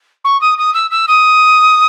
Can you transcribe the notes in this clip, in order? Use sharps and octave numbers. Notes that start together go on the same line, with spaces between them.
C#6
D#6
D#6
E6
E6
D#6